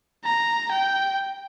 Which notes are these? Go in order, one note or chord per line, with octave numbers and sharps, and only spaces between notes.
A#5
G5